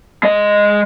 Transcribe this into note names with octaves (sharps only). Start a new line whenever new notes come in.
G#3 D#5